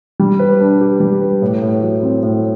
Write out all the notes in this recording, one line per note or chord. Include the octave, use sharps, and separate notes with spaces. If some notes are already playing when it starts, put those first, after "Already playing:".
G3
B4
D4
G4
G3
B4
A2
A2
F#3
C4
A2